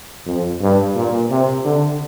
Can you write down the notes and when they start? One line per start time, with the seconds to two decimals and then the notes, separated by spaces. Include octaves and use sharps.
0.27 F2
0.61 G2
0.96 A#2
1.30 C3
1.65 D3